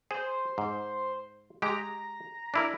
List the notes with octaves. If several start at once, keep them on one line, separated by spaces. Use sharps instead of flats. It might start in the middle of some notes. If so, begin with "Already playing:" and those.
G#4 C5
G#2
G#3 G4 A#5
D4 E4 A#4